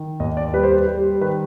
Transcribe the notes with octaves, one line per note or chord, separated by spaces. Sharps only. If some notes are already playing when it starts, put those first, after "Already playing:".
Already playing: D#3
D#2 D#5
D5
G3 B4
C5
B4
G3
D#3 B4